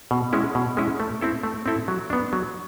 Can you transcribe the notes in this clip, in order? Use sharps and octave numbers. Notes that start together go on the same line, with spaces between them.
B2
G#3 C#4 E4
B2
G#3 C#4 E4
A3
C4 E4 A4
A3
C4 E4 A4
F#3
B3 D4
F#3